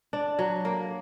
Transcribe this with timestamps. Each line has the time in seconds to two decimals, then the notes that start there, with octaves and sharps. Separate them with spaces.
0.13 D4
0.39 F#3
0.65 A#3